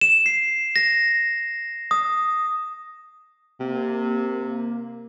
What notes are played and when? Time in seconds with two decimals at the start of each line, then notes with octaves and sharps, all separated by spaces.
0.01 E7
0.26 C7
0.76 A#6
1.91 D#6
3.60 C3 A#3